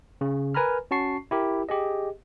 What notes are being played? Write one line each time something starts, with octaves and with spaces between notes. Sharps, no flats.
C#3
A#4 B4 G#5 A#5 B5 F6
C#4 F#4 A5 C#6 C7
E4 G4 A#4
G4 G#4 D#5